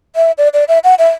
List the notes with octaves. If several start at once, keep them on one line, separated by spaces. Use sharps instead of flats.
E5
D5
D5
E5
F#5
E5